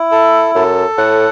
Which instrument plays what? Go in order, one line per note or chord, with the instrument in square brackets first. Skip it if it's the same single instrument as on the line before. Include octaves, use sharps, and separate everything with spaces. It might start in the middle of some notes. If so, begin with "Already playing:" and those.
Already playing: [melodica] E4
A4
[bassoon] F#2 [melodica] A4
[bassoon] A2 [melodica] F#5